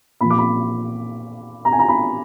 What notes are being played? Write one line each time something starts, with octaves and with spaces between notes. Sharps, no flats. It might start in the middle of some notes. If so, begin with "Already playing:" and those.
A#2 F3 B5
D6
B5
A#5
G#5
A#5
B5